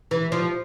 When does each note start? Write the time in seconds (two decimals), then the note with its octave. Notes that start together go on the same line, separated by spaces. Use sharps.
0.11 E3
0.32 F3